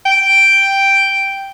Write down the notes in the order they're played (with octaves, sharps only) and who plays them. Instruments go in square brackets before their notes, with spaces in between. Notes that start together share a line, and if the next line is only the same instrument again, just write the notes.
[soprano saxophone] G5